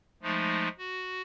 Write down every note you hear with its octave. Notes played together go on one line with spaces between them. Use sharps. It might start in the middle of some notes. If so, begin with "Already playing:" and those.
F3 G#3 A3 D#4
F#4